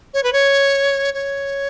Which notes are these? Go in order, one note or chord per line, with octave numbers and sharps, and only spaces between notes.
C#5
B4
C#5
C#5